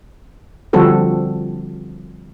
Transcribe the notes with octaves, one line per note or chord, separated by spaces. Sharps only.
D3 F3 G3 C4 F#4 A4